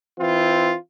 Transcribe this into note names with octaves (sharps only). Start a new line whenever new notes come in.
E3 C4 F4